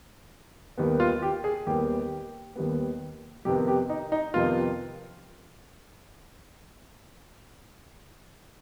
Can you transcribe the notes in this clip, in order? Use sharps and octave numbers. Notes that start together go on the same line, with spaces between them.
D#2 D#3 G3 B3
F4
G4
G#4
D#2 D#3 G3 B3 G4
D#2 D#3 G3 B3
F2 C3 D#3 B3 G4
G4
D#4
D#4
F2 C3 D#3 B3 F4